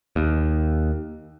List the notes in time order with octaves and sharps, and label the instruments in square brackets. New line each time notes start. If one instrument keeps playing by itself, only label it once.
[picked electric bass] D#2